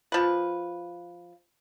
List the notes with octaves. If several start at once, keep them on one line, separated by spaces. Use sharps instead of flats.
F3 B4